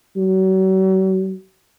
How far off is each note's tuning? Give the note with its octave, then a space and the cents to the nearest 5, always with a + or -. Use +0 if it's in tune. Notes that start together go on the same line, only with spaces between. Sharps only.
F#3 +40